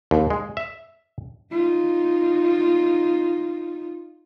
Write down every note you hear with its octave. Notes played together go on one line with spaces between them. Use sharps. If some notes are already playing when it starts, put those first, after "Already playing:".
D#2
G#3
E5
D#4 F4